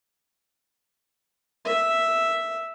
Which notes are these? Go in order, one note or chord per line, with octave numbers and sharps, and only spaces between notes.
E5